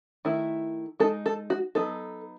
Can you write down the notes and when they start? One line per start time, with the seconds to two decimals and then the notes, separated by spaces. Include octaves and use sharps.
0.25 D#3 A3 E4
1.00 G#3 A4
1.03 D#4
1.26 A4
1.50 F#4
1.75 F#3 B3 D#4 A4